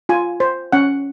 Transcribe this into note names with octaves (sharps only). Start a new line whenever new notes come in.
F4 G#5
C5
C#4 F#5